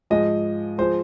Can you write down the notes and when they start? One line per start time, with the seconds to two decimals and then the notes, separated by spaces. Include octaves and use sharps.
0.10 G#2 F3 G#3 D#5
0.78 F3 G#3 C5